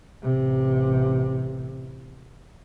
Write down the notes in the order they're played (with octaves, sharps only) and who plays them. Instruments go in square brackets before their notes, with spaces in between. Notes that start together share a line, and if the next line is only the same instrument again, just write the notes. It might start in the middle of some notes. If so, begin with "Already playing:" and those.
[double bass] A1 C3